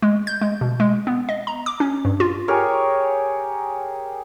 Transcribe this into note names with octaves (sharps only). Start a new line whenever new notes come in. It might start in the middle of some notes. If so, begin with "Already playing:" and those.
G#3
G6
G#3
B2
G#3
B3
D#5
A#5
D6
C#4
G2
F4
G4 G#4 A#4 C#5